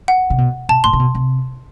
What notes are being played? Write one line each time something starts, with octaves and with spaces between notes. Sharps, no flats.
F#5
C3
B2
B2 A5
A2 C6
C3
B2
C3